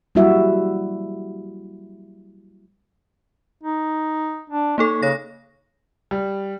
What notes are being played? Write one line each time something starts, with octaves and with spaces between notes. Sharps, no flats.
F#3 G3 A#3 E4 F#4 E5
D#4
D4
A#3 D#4 A4 C#5
C#3 C#5 A#6
G3